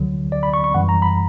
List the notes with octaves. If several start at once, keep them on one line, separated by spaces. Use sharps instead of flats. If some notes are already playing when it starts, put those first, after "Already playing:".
Already playing: D2 D3 F#3
D5
B5
C#6
C#6
F#2 E3 G3 F#5
A#5
B5